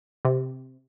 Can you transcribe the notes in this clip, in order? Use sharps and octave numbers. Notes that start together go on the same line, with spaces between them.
C3